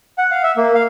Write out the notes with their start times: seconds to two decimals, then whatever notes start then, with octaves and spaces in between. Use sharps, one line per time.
0.18 F#5
0.31 F5
0.43 E5
0.57 A#3
0.75 F5